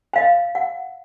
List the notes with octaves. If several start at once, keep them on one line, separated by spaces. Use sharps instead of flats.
D#5 F5 G5
F#5